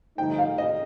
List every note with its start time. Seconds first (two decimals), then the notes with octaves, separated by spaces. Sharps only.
0.18 G2 D3 F3 A3 D#4 G5
0.38 F5
0.58 D#5